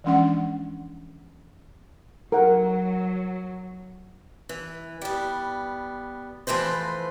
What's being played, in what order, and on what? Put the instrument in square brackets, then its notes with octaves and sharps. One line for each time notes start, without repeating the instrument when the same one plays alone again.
[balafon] E3 F3 G#3 C#4 D4 F#5
[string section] F#3 [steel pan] A#4 F#5
[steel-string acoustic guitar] E3
G3 B3
E3 F3 A3 B4 C5